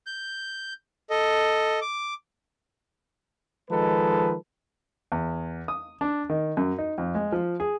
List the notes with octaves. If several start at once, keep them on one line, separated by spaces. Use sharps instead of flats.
G6
A4 D#5
D6
D#3 F3 G#3 A4 B4
E2
D#6
D4
D#3
F#2
D#4
F2
G#3
F3
G#4